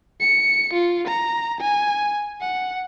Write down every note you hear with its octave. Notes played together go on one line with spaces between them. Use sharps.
C#7
F4
A#5
G#5
F#5